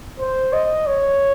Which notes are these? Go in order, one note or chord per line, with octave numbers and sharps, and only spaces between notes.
C5
D#5
C#5